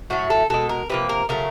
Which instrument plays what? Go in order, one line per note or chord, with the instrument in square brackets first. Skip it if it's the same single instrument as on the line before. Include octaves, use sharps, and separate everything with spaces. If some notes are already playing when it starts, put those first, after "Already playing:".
[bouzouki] A2 F#3 A3 F#4
A4
B2 G#3 A4
A#4
C3 F3 A#3 B4
A#4
C#3 F#3 A3 A#4